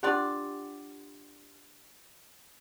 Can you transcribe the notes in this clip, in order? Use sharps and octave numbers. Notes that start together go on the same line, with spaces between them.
D4 F4 G4 D5 F#5 G5